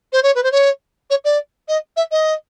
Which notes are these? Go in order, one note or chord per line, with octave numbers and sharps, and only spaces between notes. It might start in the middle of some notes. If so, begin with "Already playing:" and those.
C5
C#5
B4
C5
C#5
C#5
D5
D#5
E5
D#5